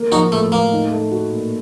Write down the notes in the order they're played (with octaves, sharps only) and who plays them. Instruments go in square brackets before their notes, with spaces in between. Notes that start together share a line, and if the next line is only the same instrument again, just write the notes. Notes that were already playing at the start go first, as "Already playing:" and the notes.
Already playing: [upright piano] A#3
[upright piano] F3 [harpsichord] D#4 F#4
[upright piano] A2 [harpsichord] A3
[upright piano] A2 [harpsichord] A#3
[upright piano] D#4
A3
F#4
A#2